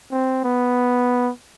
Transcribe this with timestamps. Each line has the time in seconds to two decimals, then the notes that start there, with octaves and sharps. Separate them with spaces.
0.11 C4
0.44 B3